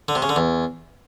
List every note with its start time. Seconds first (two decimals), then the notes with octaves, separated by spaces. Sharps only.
0.08 D3
0.15 C3
0.22 C#3
0.29 D3
0.36 E2